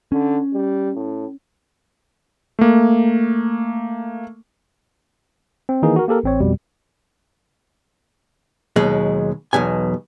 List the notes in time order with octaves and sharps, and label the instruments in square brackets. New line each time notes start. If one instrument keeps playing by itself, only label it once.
[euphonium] D3 [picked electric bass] C#4
[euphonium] G3
A2
[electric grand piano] A3 A#3
[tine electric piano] C4
D#3 E3 A#3 D#4 G#4
F#4 A#4
A#3 G4 A4 A#4
A1 C4 C#5
F2 B2 G3
[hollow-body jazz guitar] D#2 B2 F#3 G#3
B1 E2 B2 G#5